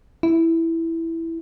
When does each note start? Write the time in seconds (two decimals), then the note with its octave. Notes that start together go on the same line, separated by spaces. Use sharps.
0.23 E4